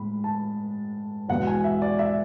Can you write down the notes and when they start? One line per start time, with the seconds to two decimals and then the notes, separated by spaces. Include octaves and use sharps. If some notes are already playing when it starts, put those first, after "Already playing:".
Already playing: A2 G#3 B5
0.24 A5
1.29 E2 B2 G#3 F#5
1.47 G#5
1.64 E5
1.82 D5
1.99 E5